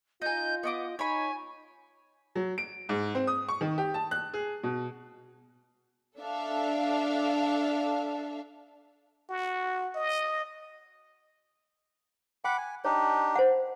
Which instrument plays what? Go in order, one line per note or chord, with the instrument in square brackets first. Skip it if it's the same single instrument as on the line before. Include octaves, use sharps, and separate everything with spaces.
[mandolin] D#4 G#5 [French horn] F4 [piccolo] G6
[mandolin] B3 C#6 D6 [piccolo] D#5
[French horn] D#4 [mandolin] C#5 B5 [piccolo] G#5
[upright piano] F#3
D7
G#2
C4
D#6
C#6
D#3
G4
A5
F#6
G#4
B2
[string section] D4 A4 E5 F5
[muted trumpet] F#4
D#5
[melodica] F#5 B5 D6 [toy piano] G5
[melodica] G#5
[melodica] D4 D#4 G4 [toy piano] C#5
[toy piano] C5 F#5